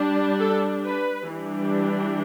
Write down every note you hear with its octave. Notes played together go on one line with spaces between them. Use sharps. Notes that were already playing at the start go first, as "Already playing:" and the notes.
Already playing: G3 D4
A4
B4
E3 G3 D4